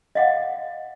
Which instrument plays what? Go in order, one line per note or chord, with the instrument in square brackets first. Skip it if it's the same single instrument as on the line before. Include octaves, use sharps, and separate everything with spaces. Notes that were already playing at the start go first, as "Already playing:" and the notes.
[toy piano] D#5 F5 F#5